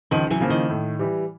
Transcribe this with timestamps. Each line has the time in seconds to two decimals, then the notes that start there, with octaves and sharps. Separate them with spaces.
0.11 C#2 D#3 F3
0.30 E3 F#3
0.40 C#3 F3 A#3
0.50 D#3
0.70 A2
0.99 E3 G3